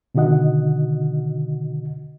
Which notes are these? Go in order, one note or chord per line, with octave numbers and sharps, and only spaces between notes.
B2 D3 D#3 F#4 D#5 F#5